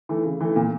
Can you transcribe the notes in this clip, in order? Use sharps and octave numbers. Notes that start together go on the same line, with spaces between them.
E3 A3
C#3
E3 A3
A#2